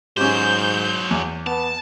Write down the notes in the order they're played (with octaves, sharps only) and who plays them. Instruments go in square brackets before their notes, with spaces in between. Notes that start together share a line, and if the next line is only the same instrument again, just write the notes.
[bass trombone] G#2 [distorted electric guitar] F#3 C5 [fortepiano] C#4 G4 [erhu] G6
[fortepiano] E2
[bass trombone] B3 [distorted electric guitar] A5